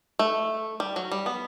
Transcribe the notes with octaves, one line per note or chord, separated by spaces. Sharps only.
A3
G3
F#3
G3
B3